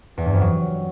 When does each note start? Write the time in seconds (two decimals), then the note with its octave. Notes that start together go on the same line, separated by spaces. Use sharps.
0.17 E2
0.25 G2
0.33 F2
0.41 F#3